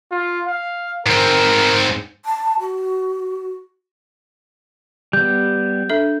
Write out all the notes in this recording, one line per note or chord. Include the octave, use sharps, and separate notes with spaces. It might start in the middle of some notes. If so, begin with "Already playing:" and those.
F4
F5
G#2 C4 A#4
A5
F#4
G3 B3 G6
D4 A4 E5